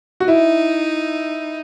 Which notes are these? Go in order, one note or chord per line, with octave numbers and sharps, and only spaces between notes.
F#4
D#4 E4